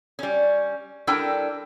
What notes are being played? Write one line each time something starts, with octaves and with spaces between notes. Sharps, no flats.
G3 C#4
G3 D4 E4 A4 A#4 G5